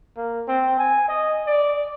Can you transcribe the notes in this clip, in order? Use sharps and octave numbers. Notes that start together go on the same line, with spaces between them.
A#3
C4
G#5
D#5
D5